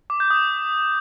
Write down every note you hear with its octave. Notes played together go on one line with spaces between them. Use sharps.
D6
G6
D#6